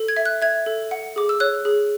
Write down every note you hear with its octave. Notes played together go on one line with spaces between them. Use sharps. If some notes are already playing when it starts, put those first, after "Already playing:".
Already playing: A4
G#6
E5
F#6
E5 G#6
A4
F#5
G#4 D6
E6
C#5 F#6
G#4